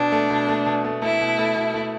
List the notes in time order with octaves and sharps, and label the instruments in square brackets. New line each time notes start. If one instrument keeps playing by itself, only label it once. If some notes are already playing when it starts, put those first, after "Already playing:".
Already playing: [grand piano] B2 [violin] D4
[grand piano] A3
B2
A3
B2
A3
[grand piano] A3 [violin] E4
[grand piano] B2
A3
B2
A3